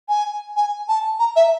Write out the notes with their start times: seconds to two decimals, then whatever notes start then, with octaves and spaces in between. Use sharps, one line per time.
0.09 G#5
0.56 G#5
0.89 A5
1.19 A#5
1.36 E5